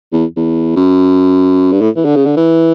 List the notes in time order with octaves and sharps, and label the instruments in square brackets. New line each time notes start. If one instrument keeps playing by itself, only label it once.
[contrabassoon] E2
E2
F#2
G2
A2
E3
D3
C#3
D3
E3